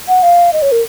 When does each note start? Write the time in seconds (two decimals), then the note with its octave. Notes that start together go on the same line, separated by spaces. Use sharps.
0.08 F#5
0.23 F5
0.53 D#5
0.62 C#5
0.72 A#4